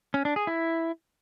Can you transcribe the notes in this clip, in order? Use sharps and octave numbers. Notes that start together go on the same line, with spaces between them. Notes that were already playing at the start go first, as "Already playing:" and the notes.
C#4
D4
G#4
E4